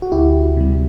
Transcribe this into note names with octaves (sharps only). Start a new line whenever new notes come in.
F#4
D2 E4 G4
C3 G3